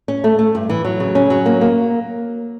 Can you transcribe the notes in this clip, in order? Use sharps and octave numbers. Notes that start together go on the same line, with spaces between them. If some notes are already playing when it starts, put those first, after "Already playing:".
C#4
A3
A3
G2
E3
F#3
C#3
C#4
F#3
A#3
A#3